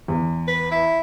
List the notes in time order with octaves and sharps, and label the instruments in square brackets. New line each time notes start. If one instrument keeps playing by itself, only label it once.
[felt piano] E2
[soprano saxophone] B4
E4